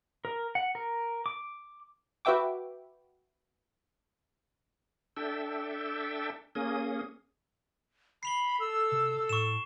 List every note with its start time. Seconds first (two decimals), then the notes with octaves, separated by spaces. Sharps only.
0.25 A#4
0.55 F#5
0.75 A#4
1.26 D6
2.25 F#4 B4 E5 G5 D6
5.17 D4 A4 E5 G5
6.55 A#3 C#4 G#4 D#6
8.23 B5 C7 F7 G7
8.60 A4 E6
8.92 C3
9.29 A2 C#6 E7